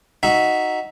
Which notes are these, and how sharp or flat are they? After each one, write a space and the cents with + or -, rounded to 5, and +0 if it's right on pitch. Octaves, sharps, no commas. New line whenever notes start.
D#4 +0 F#4 +0 E5 -5